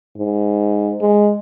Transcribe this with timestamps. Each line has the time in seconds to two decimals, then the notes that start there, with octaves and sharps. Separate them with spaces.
0.17 G#2
1.01 G#3